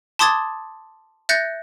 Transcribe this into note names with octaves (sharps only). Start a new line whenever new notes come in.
A5 C6 D6 D#6 G#6 A6
E5 F#6 G6 A6 A#6 C#7